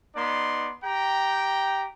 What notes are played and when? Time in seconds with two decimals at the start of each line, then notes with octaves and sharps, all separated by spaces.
0.16 B3 D#4 D5 C6
0.83 G4 G5 A#5